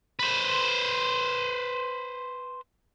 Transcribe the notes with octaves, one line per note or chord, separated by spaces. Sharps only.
B4 C5